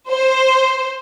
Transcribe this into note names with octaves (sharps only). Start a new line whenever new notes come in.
C5